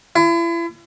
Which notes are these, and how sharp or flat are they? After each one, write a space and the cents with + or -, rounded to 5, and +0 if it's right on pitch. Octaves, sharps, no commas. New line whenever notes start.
E4 +40